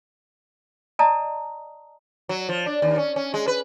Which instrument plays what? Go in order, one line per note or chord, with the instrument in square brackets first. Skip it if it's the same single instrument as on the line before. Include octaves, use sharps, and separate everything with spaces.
[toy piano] D5 D#5 A5 A#5 D#6
[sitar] F#3
F3
D4
D#2
C#4
C#4
G#3
B4